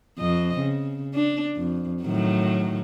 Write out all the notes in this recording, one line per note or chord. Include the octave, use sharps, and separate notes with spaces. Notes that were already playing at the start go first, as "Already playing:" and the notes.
F2 C4 D#5
C#3
D4
F2
A2 D#3 F#3